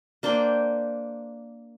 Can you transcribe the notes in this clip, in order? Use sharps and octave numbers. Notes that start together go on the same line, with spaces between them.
A#3 D4 C5 G5